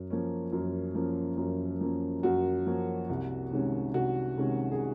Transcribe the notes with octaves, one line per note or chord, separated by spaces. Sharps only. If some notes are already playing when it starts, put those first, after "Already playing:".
Already playing: F#2
F3 A#3 C#4
F#2
F3 A#3 C#4
F#2
F3 A#3 C#4
F#2 F#4
F3 A#3 C#4
C2
C3 D#3 G#3 C#4
C2 F#4
C3 D#3 G#3 C#4
G#4